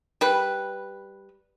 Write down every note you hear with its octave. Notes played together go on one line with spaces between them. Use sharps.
G3 B4